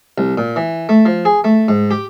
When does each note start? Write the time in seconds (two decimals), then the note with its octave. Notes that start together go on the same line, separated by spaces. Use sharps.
0.18 C2
0.38 A#2
0.56 E3
0.89 A3
1.06 F3
1.25 G#4
1.44 A3
1.68 G#2
1.91 G4